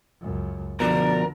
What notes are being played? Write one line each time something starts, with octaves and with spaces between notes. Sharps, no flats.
C#2 F#2
B2 D3 F3 A#4 D5